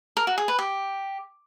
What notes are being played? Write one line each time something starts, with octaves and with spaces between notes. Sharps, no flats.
A#4
F#4
G#4
B4
G4